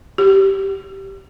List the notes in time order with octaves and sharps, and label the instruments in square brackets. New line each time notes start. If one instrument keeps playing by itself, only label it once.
[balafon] G4